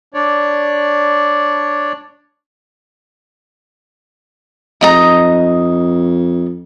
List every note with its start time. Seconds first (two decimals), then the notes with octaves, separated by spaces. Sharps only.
0.14 D4 C#5 D5
4.81 F2 D#4 D#5 A#5